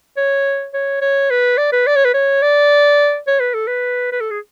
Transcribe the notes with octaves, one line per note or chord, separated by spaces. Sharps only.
C#5
C#5
C#5
B4
D5
B4
D5
C#5
B4
C#5
D5
C#5
B4
A4
B4
B4
A4
G#4